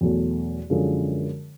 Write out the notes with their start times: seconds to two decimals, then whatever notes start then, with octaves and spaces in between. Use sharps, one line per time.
0.01 E2 B2 F#3 A3
0.70 F#2 D3 F3 G#3 C#4